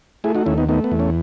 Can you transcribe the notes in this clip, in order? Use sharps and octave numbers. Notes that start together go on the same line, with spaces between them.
A3 E4 G#4
D#4 F#4
D#2 C#4 E4
B3 D#4
A3 B3 D#4
B3
E2
C#4